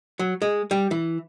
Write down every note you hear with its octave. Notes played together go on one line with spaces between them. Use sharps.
F#3
G#3
G3
E3